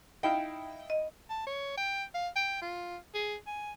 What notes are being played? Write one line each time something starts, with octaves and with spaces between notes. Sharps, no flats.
D#4 E4 F5 G5
D#5
A5
C#5
G5
F5
G5
F4
G#4
G#5